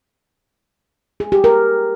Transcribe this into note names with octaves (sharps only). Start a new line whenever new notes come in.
G#4
G4
A#4